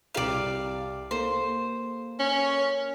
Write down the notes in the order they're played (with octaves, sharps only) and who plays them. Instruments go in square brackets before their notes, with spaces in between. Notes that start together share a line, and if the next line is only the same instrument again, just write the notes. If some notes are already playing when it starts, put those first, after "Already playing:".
[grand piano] C2 G4 A#5 [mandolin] D5 F5
[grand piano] A#3 A4 [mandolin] C5
[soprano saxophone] C#4